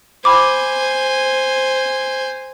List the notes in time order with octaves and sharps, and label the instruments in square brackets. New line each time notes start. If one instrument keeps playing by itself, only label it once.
[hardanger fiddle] C5 G#5 [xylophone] B5 D6